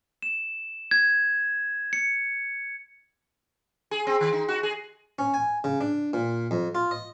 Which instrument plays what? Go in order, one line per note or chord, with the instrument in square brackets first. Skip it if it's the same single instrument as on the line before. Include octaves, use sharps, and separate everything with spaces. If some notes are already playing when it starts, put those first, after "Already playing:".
[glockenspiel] E7
G#6
C#7
[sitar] G#4
C4
D#3
D#4
F#4
G#4
[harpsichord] C#4
G#5
C#3
D4
A#2
F2
F4
D#5